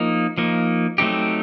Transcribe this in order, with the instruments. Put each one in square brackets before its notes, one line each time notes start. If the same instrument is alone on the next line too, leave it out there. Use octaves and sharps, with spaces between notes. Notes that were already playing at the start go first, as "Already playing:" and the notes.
Already playing: [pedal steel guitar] F3 A#3 D#4
F3 A#3 D#4
F#3 A3 C4 D#4 G4